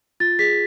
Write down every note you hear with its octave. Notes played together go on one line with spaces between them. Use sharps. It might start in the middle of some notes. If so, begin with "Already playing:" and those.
F4 A6
G#4 B6